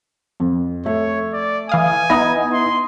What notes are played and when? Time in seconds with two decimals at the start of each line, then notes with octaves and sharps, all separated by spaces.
0.40 F2
0.86 A3 C#5
1.34 D5
1.69 E3 F5 G#5 D#6
2.10 B3 D#4 E4 D#6 A#6
2.53 C6